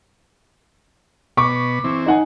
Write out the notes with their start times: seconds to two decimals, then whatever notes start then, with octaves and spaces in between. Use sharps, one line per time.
1.37 B2 B5 C#6 D6
1.84 E3 C4
2.06 D#4 F#5 G#5